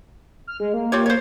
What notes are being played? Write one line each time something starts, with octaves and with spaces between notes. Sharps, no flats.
F6
G#3
A#3
F4 G4 C#5
C5 C#5